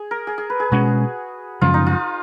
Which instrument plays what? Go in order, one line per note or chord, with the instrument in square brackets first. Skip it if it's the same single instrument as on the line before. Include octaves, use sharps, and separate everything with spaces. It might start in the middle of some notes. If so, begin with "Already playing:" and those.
Already playing: [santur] G#4
A#4
G#4
G#4
B4
G#4
[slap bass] B2 G#3 C#4 [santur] F#4
[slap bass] F#2 C#3 F3 G#3 [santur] F4
[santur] D#4
F4